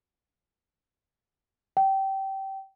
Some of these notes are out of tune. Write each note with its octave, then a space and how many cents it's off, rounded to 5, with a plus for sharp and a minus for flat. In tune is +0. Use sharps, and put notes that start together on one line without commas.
G5 -20